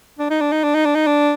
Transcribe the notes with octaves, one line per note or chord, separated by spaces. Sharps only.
D4
D#4
D4
D#4
D4
D#4
D4
D#4
D4